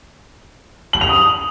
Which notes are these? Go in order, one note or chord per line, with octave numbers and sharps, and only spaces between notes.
F#7
F7
D#6